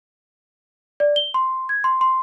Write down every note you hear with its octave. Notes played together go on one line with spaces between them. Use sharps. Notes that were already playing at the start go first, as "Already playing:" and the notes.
D5
G7
C6
G#6
C6
C6